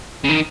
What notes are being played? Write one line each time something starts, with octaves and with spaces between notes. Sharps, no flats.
C#3
D#3